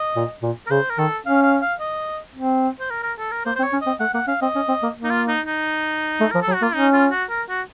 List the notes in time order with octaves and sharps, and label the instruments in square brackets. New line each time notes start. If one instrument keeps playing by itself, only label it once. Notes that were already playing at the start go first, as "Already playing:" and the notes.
Already playing: [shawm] D#5
[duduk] A#2
A#2
[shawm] A#4
[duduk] C#3 [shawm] C5
[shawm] A#4
[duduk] D#3 [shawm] A4
[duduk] C#4 [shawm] F5
[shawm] F5
F5
D#5
[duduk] C4
[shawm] C5
A#4
A#4
A4
A#4
[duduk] A#3 [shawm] C5
[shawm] C5
[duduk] C4
[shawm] C#5
[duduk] C#4
[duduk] C4 [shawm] D#5
[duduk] A3 [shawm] F#5
[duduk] A#3 [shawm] F#5
[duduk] C#4 [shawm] F5
[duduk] C4 [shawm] D#5
[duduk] C#4
C4
A#3
A#3
[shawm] D#4
F4
D#4
D#4
[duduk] A3
[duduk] F3 [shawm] A#4
[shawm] A4
[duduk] F#3
[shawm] F#4
[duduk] A#3 [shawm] F4
[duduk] C#4 [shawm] D#4
[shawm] F4
F#4
A#4
F#4